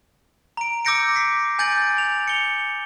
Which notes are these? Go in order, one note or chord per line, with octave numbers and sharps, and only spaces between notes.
A#5 D7
D6 E6 G6 A#6 C#7 D7
B6 C7
G#5 G6 A6 D7 F#7
F7
C#7 G7